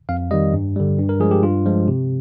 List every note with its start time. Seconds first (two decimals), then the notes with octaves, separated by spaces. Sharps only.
0.09 F2 F5
0.31 D#3 G3 D#5
0.54 G2
0.76 D3 G3
0.98 G2
1.09 A#4
1.20 F3 G#3 G#4
1.31 G4
1.43 G2 F4
1.66 F3 G#3
1.88 C3